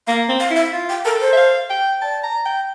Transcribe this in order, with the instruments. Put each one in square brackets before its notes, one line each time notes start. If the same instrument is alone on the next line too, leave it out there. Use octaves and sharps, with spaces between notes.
[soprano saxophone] A#3 [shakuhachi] F5
[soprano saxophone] C4
[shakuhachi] F5
[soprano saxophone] E4
[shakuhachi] E5
[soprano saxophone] F4
[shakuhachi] G5
[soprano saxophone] A4 [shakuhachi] A#4
[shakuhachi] C5
[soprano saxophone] E5
F5
G5
[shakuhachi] D5 [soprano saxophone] A5
[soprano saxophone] A#5
G5